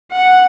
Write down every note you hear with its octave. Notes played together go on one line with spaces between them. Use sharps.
F#5